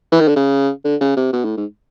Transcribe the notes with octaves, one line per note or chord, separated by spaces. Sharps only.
E3
D#3
D3
C#3
D3
C#3
C3
B2
A2
G#2